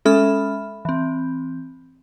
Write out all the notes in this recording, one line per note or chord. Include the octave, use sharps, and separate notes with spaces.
G#3 C#4 A4 E5 B5 F6
E3 C4